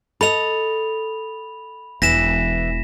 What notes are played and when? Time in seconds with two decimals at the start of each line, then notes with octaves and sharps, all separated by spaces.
0.21 A4 D#5 B5 F7
2.02 E1 E3 D4 A#6 B6 E7